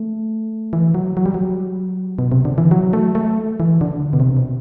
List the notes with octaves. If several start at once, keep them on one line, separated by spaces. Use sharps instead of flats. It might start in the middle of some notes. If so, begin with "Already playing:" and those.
Already playing: A3
E3
F#3
F#3
G3
F#3
B2
C3
D3
E3
F#3
A3
A3
E3
D3
B2
C3
B2